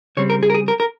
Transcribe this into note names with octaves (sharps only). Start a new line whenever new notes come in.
C#3 G3 C4 C#5
A#4
G#4
A#4
G#4
A#4
A#4